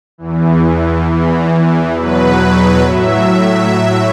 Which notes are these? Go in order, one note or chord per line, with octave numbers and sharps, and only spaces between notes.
E2 E3
E2 E3
E2 B2 F#3 B4
A2 F#3 E5
A2 F#3